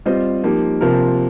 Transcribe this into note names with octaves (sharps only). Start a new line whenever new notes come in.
G3 C4 F4 C5 D#5
F3 A#3 D#4 G4
C3 F3 A#3 F4 A#4